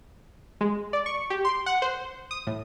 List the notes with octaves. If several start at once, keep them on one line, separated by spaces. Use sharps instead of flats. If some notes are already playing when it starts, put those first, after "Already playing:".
G#3
D5
C#6
G4
C6
F#5
C5
D#6
A2